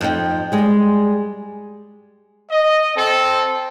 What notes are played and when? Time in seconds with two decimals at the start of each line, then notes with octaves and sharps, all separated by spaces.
0.01 F2 D#4 G5
0.52 G3 G#3 G#4
2.50 D#5
2.96 C4 A4